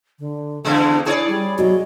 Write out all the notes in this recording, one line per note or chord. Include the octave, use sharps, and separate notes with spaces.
D3
E2 D3 G#3 D4
E4 G#4 C#5 D5
G3
F#3 D#5